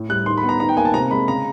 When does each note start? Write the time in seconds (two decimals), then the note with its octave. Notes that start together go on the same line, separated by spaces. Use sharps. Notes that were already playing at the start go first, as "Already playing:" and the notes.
Already playing: A2
0.09 G3 F#6
0.26 D#3 C6
0.38 B5
0.43 B3
0.49 A#5
0.60 D#3 A#5
0.69 G5
0.77 A#3 G#5
0.85 A5
0.94 C3 A#5
1.11 G#3 B5
1.28 C#3 A#5